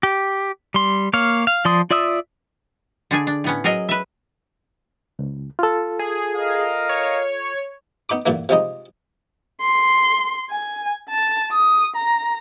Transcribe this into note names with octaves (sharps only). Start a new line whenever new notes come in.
G4
G3 C6
A#3 C#5 F5
F5
F3 D5 C6 D#6
F4 D5 E5 D#6 E6
D3 D4 G#4 G#5
D4
A2 B3 C#4
F#3 G#4 A#4 D#5
B4 E5
C#2
F4 A4
G#4
A#4 D#5 F5
C#5
B3 D#4 B5 D6
G2 A#2 D3 E3 A#3
C3 F3 G3 G#3 D#4 D#5
C6
G#5
A5
D#6
A#5